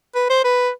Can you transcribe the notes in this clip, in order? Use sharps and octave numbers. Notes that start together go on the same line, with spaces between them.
B4
C5
B4